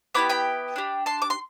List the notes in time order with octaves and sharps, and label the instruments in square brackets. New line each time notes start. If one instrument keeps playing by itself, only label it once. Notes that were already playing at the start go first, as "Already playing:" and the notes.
[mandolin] B3 E4 G4 B5 D6
G5 B5
D4 G4
A5 C6
D6
C6